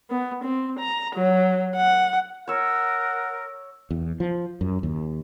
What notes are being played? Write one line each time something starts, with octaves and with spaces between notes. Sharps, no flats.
B3
C4
A#5
F#3
F#5
A#4 C#5 F#5 E6
E2
F3
F#2
D#2